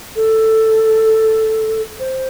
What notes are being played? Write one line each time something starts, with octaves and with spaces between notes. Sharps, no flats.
A4
C5